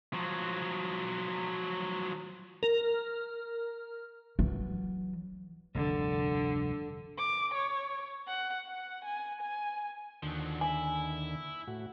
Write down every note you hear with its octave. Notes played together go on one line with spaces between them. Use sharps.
F3 F#3
A#4
E3 F#3
F1 D2 G2 D3
D6
C#5
F#5
F#5
G#5
G#5
D#2 D3 F3 F#3
E4 G#5
A2 F#4